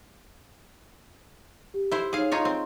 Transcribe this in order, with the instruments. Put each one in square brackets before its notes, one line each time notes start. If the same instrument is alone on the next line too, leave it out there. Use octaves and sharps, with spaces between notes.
[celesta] G4
[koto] E4 C5
[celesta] D#4 C#5 [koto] G#4 F5
[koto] D#4 F4 C#5 [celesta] C6 C#6
[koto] C4